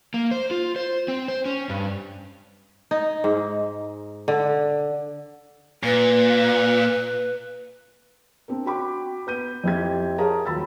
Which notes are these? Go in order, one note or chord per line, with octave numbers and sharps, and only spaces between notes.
A#3
C5
F4
C5
C4
C5
C#4
G2
D#4
G#2
D3
A#2 B4
C4 D4 A#4
F#4 G5 B5 D6
B3 G6 D#7
F2 C4 E4 G4 G#6
G#4 A#4 C#5 F5 A5 A#5
D#1 F#3 B5 E6 A6